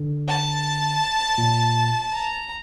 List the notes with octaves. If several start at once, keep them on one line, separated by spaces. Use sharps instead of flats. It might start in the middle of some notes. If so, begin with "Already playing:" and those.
Already playing: D3
A5
A#2
A#5